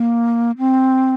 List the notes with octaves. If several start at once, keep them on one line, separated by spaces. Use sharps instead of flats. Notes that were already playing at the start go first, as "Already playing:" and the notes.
Already playing: A#3
C4